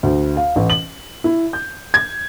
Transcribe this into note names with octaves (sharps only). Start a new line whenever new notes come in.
D2
F5
A1
F#7
E4
G6
G#6